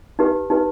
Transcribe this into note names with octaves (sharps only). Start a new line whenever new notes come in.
D#4 G4 B4
D#4 G4 B4